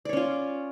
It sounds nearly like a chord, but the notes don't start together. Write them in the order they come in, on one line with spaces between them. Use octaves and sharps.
D5 C#5 C#4 F4